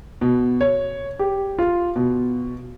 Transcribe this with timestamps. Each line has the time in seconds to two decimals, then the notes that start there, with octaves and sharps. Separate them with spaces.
0.21 B2
0.61 C#5
1.19 G4
1.59 F4
1.96 B2